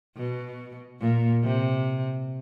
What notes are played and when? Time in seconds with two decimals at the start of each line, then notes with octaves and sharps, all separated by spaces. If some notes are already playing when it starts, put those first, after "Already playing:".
0.16 B2
1.00 A#2
1.43 C3